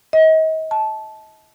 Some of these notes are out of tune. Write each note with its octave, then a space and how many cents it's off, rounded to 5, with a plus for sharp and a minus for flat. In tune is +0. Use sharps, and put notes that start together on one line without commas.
D#5 +35
A5 -15